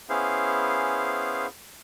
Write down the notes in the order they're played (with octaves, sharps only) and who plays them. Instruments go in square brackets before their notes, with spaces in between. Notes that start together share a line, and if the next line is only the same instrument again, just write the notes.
[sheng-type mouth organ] B3 C#4 E4 G#4 C5 F5